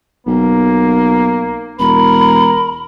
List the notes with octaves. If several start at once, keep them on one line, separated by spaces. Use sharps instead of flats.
B1 A#3
E1 A#4 B5